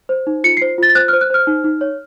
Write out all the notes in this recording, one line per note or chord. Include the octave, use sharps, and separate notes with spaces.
C5
D#4
F4 C#7
C5 C7
F4 A6
A6
C5 F#6
C5 F6
F#6
C5 F6
D#4
D#4
C#5